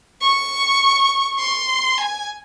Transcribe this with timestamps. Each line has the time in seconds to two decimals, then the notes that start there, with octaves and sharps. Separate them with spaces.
0.21 C#6
1.39 C6
1.98 G#5